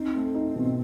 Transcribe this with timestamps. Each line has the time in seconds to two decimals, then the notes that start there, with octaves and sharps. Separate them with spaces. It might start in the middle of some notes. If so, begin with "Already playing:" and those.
Already playing: C4 D#4
0.15 A3
0.35 D#4
0.56 B2